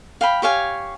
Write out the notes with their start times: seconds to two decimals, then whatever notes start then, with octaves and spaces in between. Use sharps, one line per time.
0.21 F5 G5 B5
0.42 G4 C#5 F5 G#5